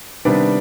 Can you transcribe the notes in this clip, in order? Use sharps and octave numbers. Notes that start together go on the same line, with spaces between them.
C3 D#3 G3 B3 D4